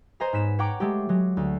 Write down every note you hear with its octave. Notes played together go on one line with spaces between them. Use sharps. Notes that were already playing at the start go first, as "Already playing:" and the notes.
C5 C#5 D#5 G#5 A#5
G#2 B3 B6 E7
C#5 F#5 G5 A#5 C#6 D6
G#3 A3 G4
F#3 G#3
D2